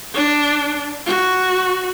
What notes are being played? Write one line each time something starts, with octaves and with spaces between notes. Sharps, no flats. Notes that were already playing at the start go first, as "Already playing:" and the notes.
D4
F#4